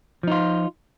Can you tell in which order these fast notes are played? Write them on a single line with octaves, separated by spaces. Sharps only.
F3 D#4 F4